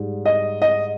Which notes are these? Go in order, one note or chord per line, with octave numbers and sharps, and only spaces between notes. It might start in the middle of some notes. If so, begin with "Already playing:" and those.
Already playing: G#2 G3
D#5
D#5